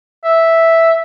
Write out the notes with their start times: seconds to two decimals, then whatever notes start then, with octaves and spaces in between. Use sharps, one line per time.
0.24 E5